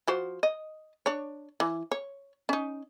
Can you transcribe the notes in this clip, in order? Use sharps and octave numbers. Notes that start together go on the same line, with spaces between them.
F3 F#4 C5
D#5
D4 C#5
E3
C#5
C#4 D#4